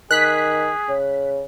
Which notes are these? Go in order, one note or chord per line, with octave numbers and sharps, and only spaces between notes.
D#3 G#4 F#6 B6
C#3